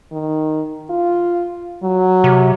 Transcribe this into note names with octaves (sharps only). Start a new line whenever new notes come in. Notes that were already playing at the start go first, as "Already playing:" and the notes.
D#3
F4
F#3
C3